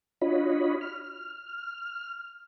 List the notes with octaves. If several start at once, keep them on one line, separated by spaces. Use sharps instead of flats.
D4 F4 F#4 C#5 D#5 B5
F6